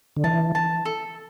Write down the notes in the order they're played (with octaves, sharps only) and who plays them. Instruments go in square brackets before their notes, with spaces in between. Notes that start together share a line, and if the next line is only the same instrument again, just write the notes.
[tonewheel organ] D3
[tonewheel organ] E3 [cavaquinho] A5
[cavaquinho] A5
A4